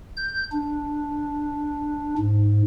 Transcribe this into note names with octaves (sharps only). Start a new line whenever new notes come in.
G6
D4
G#2